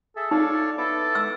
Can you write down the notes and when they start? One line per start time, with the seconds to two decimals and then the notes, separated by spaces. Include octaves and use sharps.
0.16 G#4 A4 E5
0.31 D#4 C#5 D5 F5
0.78 B3 E4 A4 D6
1.15 E6